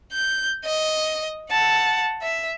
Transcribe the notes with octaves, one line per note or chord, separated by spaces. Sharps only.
G6
D#5
F#5 A5
E5